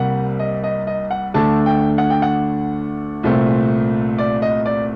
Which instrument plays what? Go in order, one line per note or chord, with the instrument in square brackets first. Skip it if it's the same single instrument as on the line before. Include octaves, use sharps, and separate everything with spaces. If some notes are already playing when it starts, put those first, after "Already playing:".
Already playing: [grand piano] C2 C3 G3 A#3 F#5
D#5
D#5
D#5
F#5
D2 D3 A3 D4 A5
G5
F#5
G5
F#5
C2 A#2 A3 C4
D5
D#5
D5